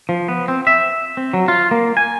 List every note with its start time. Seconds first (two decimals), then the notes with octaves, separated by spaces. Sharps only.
0.09 F3
0.28 B3
0.48 C4
0.67 E5
1.17 C4
1.34 F#3
1.48 F4
1.71 A#3
1.97 G#5